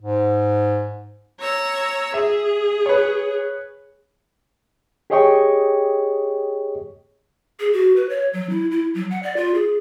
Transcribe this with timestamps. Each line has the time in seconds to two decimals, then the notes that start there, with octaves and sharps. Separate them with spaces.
0.02 G#2
1.40 C#5 A#5 E6
2.14 G#4 E5
2.86 B4 C#5
5.10 G4 G#4 C#5 D#5 G5 C#6
7.60 G#4
7.73 F#4
7.96 B4
8.09 C#5
8.33 F#3
8.50 E4
8.71 E4
8.95 F#3
9.11 F#5
9.23 D5
9.37 F4
9.55 G#4